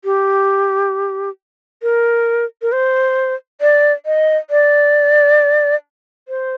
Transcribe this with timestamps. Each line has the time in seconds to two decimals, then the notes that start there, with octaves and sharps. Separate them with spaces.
0.05 G4
1.83 A#4
2.62 A#4
2.72 C5
3.61 D5
4.06 D#5
4.50 D5
6.28 C5